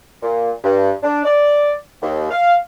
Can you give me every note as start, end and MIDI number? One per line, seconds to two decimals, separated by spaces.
0.23 0.51 46
0.64 0.92 43
1.03 1.22 62
1.25 1.73 74
2.01 2.28 39
2.31 2.55 77